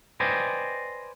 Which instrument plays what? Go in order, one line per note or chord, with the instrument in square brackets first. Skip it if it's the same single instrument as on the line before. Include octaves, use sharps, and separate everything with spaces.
[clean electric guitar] B4 C5 D5 D#5 G5 G#5